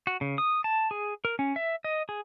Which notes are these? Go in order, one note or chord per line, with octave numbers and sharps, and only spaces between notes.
F#4
C#3
D#6
A5
G#4
A#4
C#4
E5
D#5
G#4